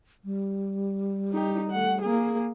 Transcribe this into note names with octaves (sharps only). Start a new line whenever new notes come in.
G3
D#4 G4
A3 F#5
A#3 G#4